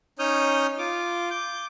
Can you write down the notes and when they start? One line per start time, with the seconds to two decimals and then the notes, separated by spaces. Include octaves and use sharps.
0.19 C#4 D#4 C#5 D#6 F6 G6
0.79 F4 D6
1.30 D6 G6